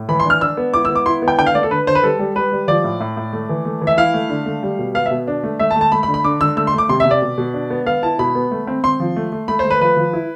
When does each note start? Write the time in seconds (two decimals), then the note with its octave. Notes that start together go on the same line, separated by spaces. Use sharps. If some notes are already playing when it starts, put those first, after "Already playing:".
Already playing: A2
0.09 E3 B5
0.20 C6
0.25 D4
0.30 F6
0.41 D4 E6
0.57 B3
0.74 E4 D6
0.85 B3 E6
0.95 D6
1.06 E4 C6
1.22 B3
1.28 G5
1.38 D3 G5
1.46 F5
1.55 A3 D5
1.63 A4
1.71 D3 B4
1.87 D3 C5
1.95 B4
2.03 G3 A4
2.19 G3
2.35 G3 B4
2.52 G3
2.68 F3 D5
2.84 A2
3.00 A2
3.17 A2
3.33 A3
3.49 E3
3.65 A3
3.82 E3
3.87 E5
3.98 E4 F5
4.14 A3
4.30 D3
4.46 A3
4.63 G3
4.79 B2
4.94 B3 F5
5.06 E5
5.11 B2
5.28 D4
5.43 A3
5.60 A3 E5
5.71 A5
5.76 A3
5.81 A5
5.92 A3 B5
6.03 B5
6.08 D3
6.14 B5
6.24 D3 D6
6.41 D3 E6
6.57 A3 E6
6.67 C6
6.73 A3
6.78 D6
6.89 C3 C6
7.00 E5
7.05 C3
7.11 D5
7.22 B2
7.38 B2
7.54 D4
7.70 B3
7.86 B3 F5
8.03 E4 A5
8.19 B2 B5
8.35 B3
8.51 A3
8.67 C4
8.84 C4 C6
9.00 F3
9.16 A3
9.32 A3
9.48 A3 B5
9.59 C5
9.64 A3
9.70 B4
9.81 F3 B4
9.97 F3
10.13 E4